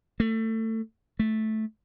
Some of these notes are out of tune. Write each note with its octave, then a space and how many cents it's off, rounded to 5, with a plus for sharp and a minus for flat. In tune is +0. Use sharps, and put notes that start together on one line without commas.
A3 +25
A3 -10